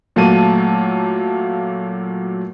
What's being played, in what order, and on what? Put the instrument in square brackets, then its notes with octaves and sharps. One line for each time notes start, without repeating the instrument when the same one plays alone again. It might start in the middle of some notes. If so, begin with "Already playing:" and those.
[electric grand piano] A#2 F#3 A3 A#3 A5 D#7